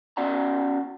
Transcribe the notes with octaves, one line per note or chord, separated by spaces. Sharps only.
B3 C#4 F#4 D5 F#5 A#5